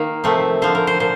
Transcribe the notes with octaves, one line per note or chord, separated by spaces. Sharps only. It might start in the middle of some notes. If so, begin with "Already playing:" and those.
Already playing: D#3 A#3
C3 F3 A3 C4
D3 F3 C4 C5
A#4
C5
A#2 C5